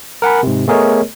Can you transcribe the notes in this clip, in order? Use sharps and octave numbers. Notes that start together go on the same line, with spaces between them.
A#4 F#5 G#5 B5
G#2 C3
A3 B3 G#4 A#4 C#5 D#5